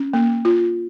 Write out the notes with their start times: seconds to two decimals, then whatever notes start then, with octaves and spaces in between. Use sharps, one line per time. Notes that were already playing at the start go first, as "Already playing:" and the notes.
Already playing: C#4
0.14 A#3
0.45 F4